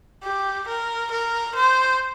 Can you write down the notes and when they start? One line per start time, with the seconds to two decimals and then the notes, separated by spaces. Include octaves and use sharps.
0.23 G4
0.68 A#4
1.11 A#4
1.55 C5